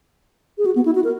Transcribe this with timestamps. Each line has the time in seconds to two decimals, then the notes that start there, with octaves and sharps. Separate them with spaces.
0.58 G#4
0.66 F#4
0.76 B3
0.86 E4
0.95 F#4
1.04 A#4